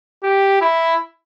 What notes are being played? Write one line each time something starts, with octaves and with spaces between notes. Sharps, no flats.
G4
E4